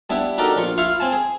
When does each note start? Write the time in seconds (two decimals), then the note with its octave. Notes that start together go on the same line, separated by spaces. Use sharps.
0.10 G3 B3 D4 E4
0.38 D#4 F#4 G4 A4 A#4 D5
0.57 A#1 F4 C#6
0.78 E4 F4 F5 C#6
1.00 C4 G#5 A5
1.12 G#4